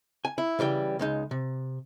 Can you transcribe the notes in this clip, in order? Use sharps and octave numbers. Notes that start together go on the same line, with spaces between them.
G#5
E4
C#3 E3 G3 G5
C#2 G#3 D#4
C3